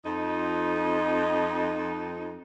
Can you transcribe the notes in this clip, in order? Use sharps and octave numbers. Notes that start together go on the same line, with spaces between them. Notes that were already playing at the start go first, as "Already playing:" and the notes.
F2 D#4